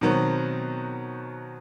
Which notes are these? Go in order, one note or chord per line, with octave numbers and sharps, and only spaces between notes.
B2 D#3 F#3 B3 C4